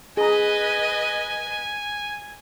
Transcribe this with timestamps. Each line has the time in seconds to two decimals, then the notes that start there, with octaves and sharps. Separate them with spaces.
0.17 G#4 B4 D#5 G#5 A#5